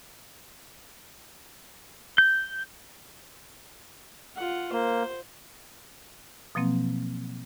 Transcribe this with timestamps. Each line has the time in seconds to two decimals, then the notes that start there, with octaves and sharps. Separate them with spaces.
2.18 G6
4.37 F4 F#5
4.72 A#3 C5
6.55 B2 F3 F#3 A#3 C4